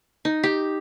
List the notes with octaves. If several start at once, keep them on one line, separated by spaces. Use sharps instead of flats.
D#4
G4